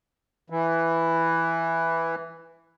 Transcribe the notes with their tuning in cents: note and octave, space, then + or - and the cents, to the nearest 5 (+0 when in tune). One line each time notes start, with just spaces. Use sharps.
E3 +5